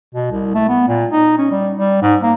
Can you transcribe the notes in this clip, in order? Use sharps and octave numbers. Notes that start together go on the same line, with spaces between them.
B2
C2
A3
B3
A#2
D#4
C#4
G3
G3
G#2
A#3